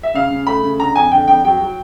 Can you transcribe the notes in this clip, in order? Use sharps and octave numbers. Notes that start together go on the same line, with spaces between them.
E5
C#3 F5
C#3
A3 B5
C#3
D3 A#5
F2 G#5
D3 G5
F2 G5
F#3 G5
F#3